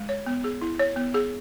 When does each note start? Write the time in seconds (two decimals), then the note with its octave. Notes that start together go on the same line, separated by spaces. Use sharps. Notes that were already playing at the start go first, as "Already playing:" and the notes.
Already playing: G#3
0.09 C#5
0.26 B3
0.44 G#4
0.61 E4
0.79 C#5
0.96 B3
1.14 G#4